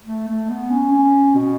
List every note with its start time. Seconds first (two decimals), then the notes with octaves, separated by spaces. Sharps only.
0.06 A3
0.27 A3
0.49 B3
0.70 C#4
0.92 C#4
1.35 B2